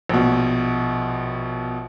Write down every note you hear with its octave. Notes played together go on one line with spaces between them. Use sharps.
A#1 B2